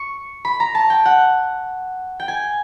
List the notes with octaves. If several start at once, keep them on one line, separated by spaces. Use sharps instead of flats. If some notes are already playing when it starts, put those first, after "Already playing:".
Already playing: C#6
B5
A#5
A5
G5
F#5
G5
G#5